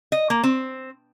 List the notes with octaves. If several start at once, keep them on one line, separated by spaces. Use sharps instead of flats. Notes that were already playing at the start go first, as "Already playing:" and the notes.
D#5
A#3
C4